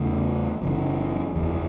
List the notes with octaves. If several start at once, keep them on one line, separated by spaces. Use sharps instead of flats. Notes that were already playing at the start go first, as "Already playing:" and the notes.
Already playing: E2 C#3 A3 C#4
F#1 F#2 C#3 E3
F#1 E2 E3